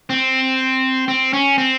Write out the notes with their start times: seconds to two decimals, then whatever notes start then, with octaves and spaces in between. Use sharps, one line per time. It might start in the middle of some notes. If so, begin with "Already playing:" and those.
0.10 C4
1.08 C4
1.33 C#4
1.58 C4